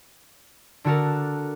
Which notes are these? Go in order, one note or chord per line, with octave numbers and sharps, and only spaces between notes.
D3 D4 F#4 A4 A#4